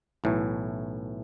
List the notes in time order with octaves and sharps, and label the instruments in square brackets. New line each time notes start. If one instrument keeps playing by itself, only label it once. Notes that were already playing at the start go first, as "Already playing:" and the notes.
[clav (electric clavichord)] B1 A2 E3 A3